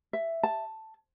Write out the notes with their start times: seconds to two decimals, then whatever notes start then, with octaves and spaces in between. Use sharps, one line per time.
0.13 E5
0.43 A5